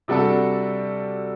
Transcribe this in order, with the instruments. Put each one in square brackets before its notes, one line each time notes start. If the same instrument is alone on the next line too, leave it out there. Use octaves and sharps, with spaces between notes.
[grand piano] C3 G3 D4 F#4 A4